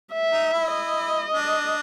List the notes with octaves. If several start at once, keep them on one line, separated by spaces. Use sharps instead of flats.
E5
D#4
E4
D#5
D4